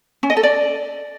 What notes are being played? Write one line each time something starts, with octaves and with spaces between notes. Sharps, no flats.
C#4
D#5
A4
D5